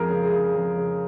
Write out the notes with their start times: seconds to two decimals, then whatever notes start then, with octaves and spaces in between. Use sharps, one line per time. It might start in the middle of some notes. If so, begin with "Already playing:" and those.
Already playing: F2 G#3 G#4 A#4
0.09 C#3
0.24 G#4
0.31 C#3
0.54 F2
0.77 C#3